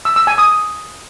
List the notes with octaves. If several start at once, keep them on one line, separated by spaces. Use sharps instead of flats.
E6
E6
G#5
D#6